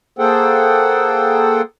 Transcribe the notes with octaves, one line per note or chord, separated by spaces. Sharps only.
A#3 G#4 A4 C5 F#5 G5